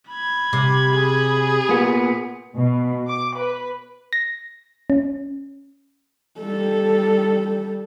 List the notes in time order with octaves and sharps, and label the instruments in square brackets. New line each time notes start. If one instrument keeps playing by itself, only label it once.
[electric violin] B5 G#6
[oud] C3
[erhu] G#4
[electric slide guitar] A#2 B3
[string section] B2
D6
B4
[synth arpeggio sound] A#6
C#4
[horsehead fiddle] G3 A4